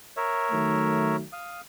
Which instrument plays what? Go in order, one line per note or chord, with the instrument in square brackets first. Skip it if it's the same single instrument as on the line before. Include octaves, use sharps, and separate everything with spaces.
[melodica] A#4 C#5 E5
[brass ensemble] D#3 F#3 A3
[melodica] F5 D#6